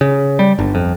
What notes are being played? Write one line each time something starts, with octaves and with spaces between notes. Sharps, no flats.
C#3
G3
G1
F2